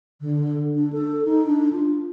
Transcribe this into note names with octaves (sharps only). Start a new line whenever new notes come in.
D3
D4
A4
D#4
D4
F4